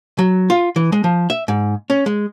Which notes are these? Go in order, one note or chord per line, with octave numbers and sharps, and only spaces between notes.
F#3
F4
E3
G#3
F3
E5
G#2
C#4
G#3